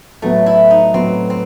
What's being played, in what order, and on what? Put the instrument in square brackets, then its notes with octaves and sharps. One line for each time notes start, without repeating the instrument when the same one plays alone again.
[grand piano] A2 F#3 B3 [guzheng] A3
[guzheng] E4
D#4
[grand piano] A2 F#3 B3 [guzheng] C4
[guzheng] C4